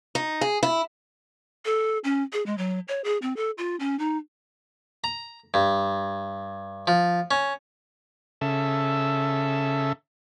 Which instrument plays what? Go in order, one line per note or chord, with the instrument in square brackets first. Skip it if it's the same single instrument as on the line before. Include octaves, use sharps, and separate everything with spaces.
[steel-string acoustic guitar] D#4
G#4
E4
[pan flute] A4
C#4
G#4
G#3
F#3
C#5
G#4
C4
A4
F4
C#4
D#4
[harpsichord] A#5
G2
F3
C#4
[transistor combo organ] C#3 A4 E5